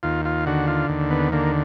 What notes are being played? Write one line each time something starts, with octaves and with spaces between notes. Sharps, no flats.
D#2 F4
F4
D3 F#4
F4
D#2
B3
D3 A#3